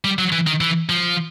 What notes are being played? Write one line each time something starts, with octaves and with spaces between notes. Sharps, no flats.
G3
F#3
E3
D#3
E3
F3